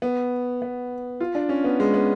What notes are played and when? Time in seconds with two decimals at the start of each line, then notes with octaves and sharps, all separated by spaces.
0.02 B3
0.62 B3
1.20 F4
1.35 D4
1.49 C#4
1.64 B3
1.80 G#3
1.94 B3